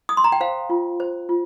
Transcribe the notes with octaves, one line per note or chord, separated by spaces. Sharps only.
D#6
C6
A#5
G5
C5 F5
F4
C5
F4